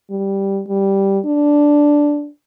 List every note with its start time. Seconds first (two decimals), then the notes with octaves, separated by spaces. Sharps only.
0.10 G3
0.68 G3
1.25 D4